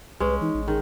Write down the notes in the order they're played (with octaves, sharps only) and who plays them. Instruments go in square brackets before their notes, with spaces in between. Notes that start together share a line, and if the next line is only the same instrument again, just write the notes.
[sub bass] C2 [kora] G#3 C#4 [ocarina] B4
[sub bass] E3 [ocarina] D#4
[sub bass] A1
[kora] D#3 [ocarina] G#4